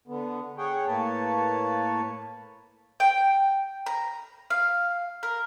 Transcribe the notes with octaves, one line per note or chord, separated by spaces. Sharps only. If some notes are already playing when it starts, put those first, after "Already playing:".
D3 B3
G#4 C#5 F#5 G5
A2 A#3 B4 C#5 A5
G5
A#5
F5
A#4